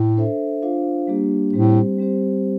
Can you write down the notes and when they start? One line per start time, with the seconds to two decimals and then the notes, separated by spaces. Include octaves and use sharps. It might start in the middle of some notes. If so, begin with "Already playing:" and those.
Already playing: A2
0.16 D4 A4 C5 E5
0.62 D4 F4 C5 F5
1.07 G3 A#3 D4 G4
1.53 A2 G3 C4 G4 C5
1.98 G3 C4 G4 C5